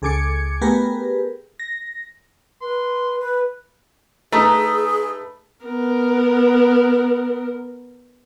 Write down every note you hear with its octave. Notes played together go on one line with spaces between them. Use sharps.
C#2 G#4 A4 D6 G#6 C#7
A3 B3 G4 G#4 A#4 B4
A#6
B4 C6
B4
A3 D#4 G#4 B4 A#5
B3 A#4